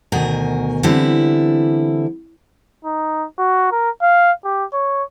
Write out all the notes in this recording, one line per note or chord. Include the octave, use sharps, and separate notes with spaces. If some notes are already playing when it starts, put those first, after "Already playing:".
D2 B2 D#3 A#4 G#5
D3 E3 G3 C4 E4
D#4
F#4
A#4
F5
G4
C#5